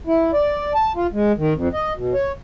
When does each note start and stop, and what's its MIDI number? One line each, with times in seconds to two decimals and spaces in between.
0.07 0.31 64
0.34 0.73 74
0.74 0.92 81
0.96 1.07 65
1.13 1.32 56
1.38 1.54 51
1.55 1.68 41
1.73 1.93 75
1.96 2.14 47
2.14 2.32 73